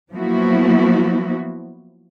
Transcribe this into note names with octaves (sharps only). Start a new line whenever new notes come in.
F3 F#3 A#3 B3 E4 F#4